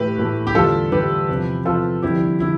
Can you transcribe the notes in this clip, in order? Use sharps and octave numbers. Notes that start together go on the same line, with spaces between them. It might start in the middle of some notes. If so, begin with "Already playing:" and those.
Already playing: A2 E3 A3 G4 B4
A2 E3 A3
G4
E2 D3 G3 F4 A4
E2 D3 G3 G4 B4
E2 C3 F3
E2 C3 F3 F4 A4
F2 D3 G3 E4 G4
D3 E4